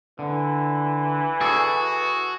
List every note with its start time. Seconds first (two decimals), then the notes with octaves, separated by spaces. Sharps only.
0.19 D3 E3
1.41 F#4 G#4 A4 D5